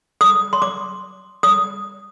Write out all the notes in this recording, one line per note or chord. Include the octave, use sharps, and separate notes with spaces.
D#6
C6
D6
D#6